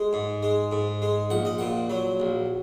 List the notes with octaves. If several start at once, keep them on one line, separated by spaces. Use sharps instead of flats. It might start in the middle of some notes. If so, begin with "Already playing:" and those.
Already playing: G#3 G#4
G#2
G#3
G#2
G#3
A#1 F#5
D#5
A#2 F#5
F#3
A#1